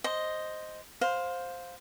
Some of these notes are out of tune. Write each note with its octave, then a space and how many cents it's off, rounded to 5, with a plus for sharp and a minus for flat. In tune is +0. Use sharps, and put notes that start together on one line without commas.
C5 +0 D#5 +0
C5 +0 F5 +20